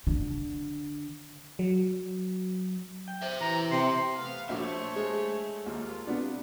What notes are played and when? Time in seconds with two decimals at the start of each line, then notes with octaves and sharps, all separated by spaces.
0.07 D3
1.59 F#3
3.08 G5
3.22 C5 E5
3.41 E3 A#5
3.71 C3 C6
4.15 A3 B3 F5
4.49 A#1 F#4 A4 C5 C#5 E5 D6
4.96 G#3
5.66 D#2 A#3 F4
6.07 C3 B3 D4